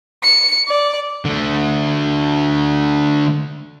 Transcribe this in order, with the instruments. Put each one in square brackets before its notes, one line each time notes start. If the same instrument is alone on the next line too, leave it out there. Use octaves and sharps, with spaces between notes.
[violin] C#7
D5
[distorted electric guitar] D3 A3